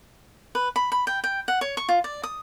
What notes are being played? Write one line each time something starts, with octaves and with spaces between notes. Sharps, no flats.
B4
B5
B5
G5
G5
F#5
C#5
C#6
F4
D5
D#6